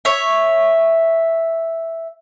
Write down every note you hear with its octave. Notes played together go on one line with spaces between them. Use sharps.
C#5 E5